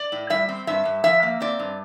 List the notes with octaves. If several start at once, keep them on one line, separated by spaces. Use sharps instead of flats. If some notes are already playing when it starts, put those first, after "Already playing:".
Already playing: D5
A2
G3 E5
C4
G2 E5
G2
F3 E5
A#3
C4 D5
G2